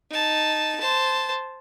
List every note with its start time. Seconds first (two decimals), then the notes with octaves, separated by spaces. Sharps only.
0.10 D#4 A5
0.80 C5 A5